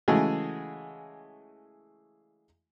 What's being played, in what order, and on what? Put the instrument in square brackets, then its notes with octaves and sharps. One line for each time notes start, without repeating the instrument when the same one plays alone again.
[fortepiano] C#3 E3 G#3 A3 F#4 G#4